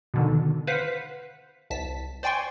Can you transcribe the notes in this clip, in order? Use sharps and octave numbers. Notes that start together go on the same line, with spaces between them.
B2 D3 D#3
B4 C5 F5 F#5 B6
C2 A5 B6
C5 D5 G5 G#5 C6 C#6